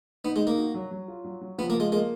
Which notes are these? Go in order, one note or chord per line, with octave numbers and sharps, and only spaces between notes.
B3 D#4
G#3
D#4
A#3
F#4
F#3
F#3
F4
F#3
F#3
F3 B3
A#3
G#3 F4
G#3 A#3